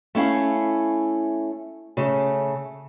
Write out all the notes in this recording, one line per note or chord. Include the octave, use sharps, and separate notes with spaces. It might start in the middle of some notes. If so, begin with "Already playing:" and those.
A3 C#4 E4 F5
C#3 A3